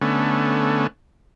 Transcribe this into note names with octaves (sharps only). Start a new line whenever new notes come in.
D3 A3 B3 C#4